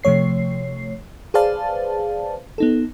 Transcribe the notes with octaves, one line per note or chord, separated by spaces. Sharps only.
C3 F3 A3 C#5 C7
G#4 B4 C5 D5 F5 A5
B3 D#4 A4